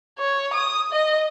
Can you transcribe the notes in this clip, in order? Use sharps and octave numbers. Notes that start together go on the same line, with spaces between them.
C#5
D#6
D#5